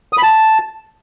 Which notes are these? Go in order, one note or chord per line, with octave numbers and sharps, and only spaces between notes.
D#6
B5
A5